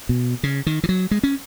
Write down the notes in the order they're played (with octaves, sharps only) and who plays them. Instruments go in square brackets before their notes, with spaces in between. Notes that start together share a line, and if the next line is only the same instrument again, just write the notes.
[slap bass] B2
C#3
D#3
E3
F#3
G#3
C#4